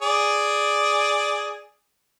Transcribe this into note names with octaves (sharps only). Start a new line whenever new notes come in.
G#4 D5